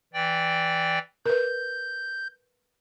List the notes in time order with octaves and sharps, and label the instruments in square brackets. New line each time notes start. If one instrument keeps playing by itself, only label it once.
[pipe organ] E3 D5 G5
[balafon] A#4 B4 [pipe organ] G6